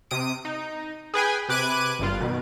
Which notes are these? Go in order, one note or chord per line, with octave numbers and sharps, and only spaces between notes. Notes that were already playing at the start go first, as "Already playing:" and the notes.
C3 D#6 D7
D#4
G#4 B4 G5 G#5
C3 B4 D6 F#6 G#6 D#7
G1 G2 F4
B2 D#3